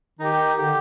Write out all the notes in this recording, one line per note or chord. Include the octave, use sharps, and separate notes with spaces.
D#3 D#4 G4
D3 G4